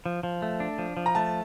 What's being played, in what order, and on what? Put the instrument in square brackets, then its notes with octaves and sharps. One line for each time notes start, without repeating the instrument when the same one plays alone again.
[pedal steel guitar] F3
F3
A3
D4
F3
F3
[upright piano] A#5
[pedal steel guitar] A3 [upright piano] A5